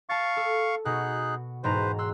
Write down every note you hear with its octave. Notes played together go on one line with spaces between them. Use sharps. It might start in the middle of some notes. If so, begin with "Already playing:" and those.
F5 A5 C#6 A6
A4
B2 D#4 F#4 G#4 F#6
E1 G#2 B4 C5 A#5
C6 E6 F#6